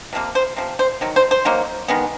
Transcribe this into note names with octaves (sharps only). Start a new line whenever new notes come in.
C3 F3 A#3
C5
C3 F3
C5
D#3 F#3
C5
C5
D#3 F#3 A#3
D#3 G#3 B3